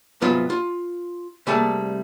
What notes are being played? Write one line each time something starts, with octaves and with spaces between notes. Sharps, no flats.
C2 G#2 F#3 B3 F4 C6
F4
C2 G3 A3 A#3 G#4 A5